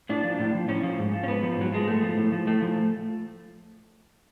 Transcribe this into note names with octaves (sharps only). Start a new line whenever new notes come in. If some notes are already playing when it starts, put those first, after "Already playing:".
A2 D4
F3
A2
F3
A2 C#4
F3
G#2
F3
C#4
G#2 B3
F3
G#2 F#3
F3 G#3
G#2 A3
F3
A2
F3
A2 A3
F3